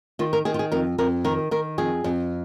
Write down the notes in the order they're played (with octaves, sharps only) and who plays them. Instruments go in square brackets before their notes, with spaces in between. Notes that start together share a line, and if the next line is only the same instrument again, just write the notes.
[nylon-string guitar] D#3 F4
A#4
D#3 G#4
F4
G#4
F2 A#4
F2 A#4
D#3 A#4
D#3 A#4
F2 G#4
F2